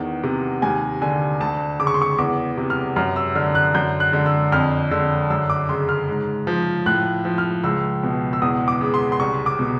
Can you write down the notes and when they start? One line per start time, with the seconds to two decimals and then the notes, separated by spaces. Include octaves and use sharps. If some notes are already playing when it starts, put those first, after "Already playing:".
Already playing: E2 D#3
0.24 C3
0.62 D#2 G#5
1.02 D3 G#5
1.40 D2 A5
1.79 C#3 D6
1.87 C#6
1.94 C6
2.02 C#6
2.18 E2 D6
2.58 C3
2.70 F6
2.96 F#2 F6
3.16 E6
3.35 D3 F6
3.55 F#6
3.74 F#2 G6
4.00 F#6
4.13 D3
4.26 E6
4.52 F2 F6
4.91 D3 E6
5.30 F#2 E6
5.50 D6
5.69 C#3 C6
5.89 F6
6.08 G#2
6.47 F3
6.86 A2 F#6
7.25 F3
7.38 F6
7.64 C#2 E6
8.03 B2
8.33 E6
8.42 E2 D#6
8.68 D6
8.81 C#3
8.94 C6
9.12 C6
9.20 C2 C#6
9.46 D6
9.59 B2